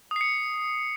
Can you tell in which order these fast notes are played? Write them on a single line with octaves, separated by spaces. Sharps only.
D#6 C7 C#7